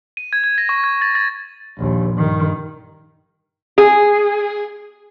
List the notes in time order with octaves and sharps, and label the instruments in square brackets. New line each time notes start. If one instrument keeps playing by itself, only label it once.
[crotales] D#7
G#6
G#6
A#6
C#6
G#6
A6
A6
[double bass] A#1 D#2
G2 D#3
[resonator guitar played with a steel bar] G#4